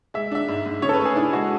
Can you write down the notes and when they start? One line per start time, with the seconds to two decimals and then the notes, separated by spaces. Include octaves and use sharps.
0.14 G#3 E5
0.31 D4 E5
0.48 G#2
0.65 G#2
0.82 C#3 C#5
0.89 A4
0.93 B4
0.99 A3
1.05 G#4
1.16 D4 E4
1.33 G#3 F#4